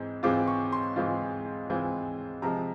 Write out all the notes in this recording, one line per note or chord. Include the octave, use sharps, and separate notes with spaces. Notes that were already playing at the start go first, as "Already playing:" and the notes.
Already playing: G#2 E3 G#3 C4
G#2 E3 G#3 C4 F4 D6
C#6
C6
G#2 E3 G#3 C4 F4
G#2 E3 G#3 C4 F4
C3 F3 G#3 A#5